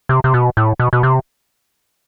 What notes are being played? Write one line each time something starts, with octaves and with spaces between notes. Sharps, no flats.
C3
C3
B2
A2
B2
B2
C3